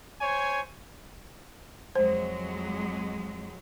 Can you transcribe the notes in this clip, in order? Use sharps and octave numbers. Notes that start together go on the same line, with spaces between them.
C5 C#5 G#5
F2 F#3 G#3 C5